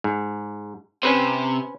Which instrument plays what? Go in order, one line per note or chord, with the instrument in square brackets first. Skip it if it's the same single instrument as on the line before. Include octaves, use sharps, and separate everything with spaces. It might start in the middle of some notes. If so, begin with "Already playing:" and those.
[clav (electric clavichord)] G#2
[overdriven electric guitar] C3 [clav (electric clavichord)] C#4 B4 C5